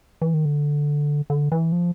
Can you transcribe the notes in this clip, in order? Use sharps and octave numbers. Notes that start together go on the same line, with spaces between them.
E3
D#3
D3
D3
E3
F3